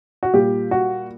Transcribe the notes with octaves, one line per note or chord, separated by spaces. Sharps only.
F#4
A#2 G3 G4
F#4